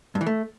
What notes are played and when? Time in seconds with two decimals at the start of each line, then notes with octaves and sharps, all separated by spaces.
0.15 G2
0.21 E3
0.26 A3